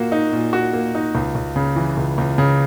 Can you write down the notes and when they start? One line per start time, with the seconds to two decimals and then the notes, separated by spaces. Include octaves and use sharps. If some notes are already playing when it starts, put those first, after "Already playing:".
Already playing: A#2 A#3 F#4
0.12 D#4
0.32 A#2
0.53 F#4
0.73 A#3
0.95 D#4
1.15 C#2
1.35 C#2
1.56 C#3
1.76 E3
1.97 C#2
2.18 C#2
2.38 C#3